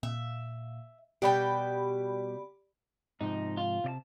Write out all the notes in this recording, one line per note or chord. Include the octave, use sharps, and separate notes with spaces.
A#2 E5
B2 G3 G4 D5 G5 B5
G#2 C3 F3 D#4
F4
C3 D5 A5